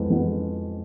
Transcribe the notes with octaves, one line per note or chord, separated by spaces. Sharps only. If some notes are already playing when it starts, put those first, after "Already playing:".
Already playing: F2 E3 G#3 B3
F2 E3 G#3 B3